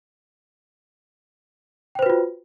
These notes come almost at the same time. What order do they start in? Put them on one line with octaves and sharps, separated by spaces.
G5 C5 B4 F#4 F4